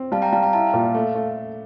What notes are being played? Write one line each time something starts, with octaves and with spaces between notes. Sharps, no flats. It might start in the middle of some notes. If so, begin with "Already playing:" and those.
Already playing: C4
G3 F5 A5
G5 A#5
G3 F5 A5
G5 A#5
E4 F5 A5
A#2
A3
A3